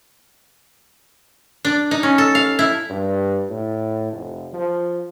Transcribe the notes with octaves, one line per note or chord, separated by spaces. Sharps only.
D4
D#4
C#4
A4
F5
E4
G2
A2
F1
F3